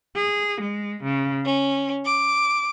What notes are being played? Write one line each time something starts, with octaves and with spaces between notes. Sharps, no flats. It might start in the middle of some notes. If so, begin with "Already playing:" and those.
G#4
G#3
C#3
C#4
D6